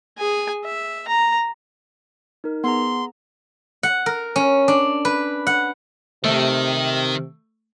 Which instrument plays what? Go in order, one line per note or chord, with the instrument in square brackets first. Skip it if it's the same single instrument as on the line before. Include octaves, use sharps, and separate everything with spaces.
[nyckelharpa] G#4 G#5
E5
A#5
[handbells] D#4 A#4
[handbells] B3 G#4 A#5 [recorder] C6
[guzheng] F#5
A#4
C#4
D4
B4
F#5
[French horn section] C3 [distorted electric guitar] D#3 [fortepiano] A3